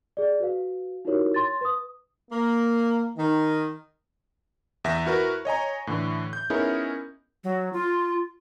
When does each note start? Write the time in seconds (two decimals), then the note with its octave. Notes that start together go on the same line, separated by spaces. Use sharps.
0.17 G#4 D5
0.40 F#4 B4 F5
1.05 D#4 E4 F#4 G4 A#4 C#5
1.34 C#5 C6 A6
1.61 B4 D#6
2.31 A#3
3.17 D#3
4.84 E2 E5 A#6 B6 E7
5.05 E4 F#4 A#4 B4
5.45 C#5 D#5 G#5 A#5
5.87 A2 D3 E3
6.33 G6
6.50 B3 C#4 D#4 E4 G#4 A#4
7.44 F#3
7.73 F4